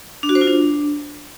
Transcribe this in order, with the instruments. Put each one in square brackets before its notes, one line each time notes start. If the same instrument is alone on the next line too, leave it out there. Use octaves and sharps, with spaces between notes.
[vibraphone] D4
F#4
C5
F4
D4